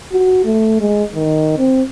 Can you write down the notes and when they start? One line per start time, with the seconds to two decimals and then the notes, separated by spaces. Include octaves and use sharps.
0.12 F#4
0.45 A3
0.80 G#3
1.15 D#3
1.58 C4